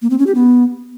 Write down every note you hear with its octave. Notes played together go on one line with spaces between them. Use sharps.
A#3
C4
C#4
G4
B3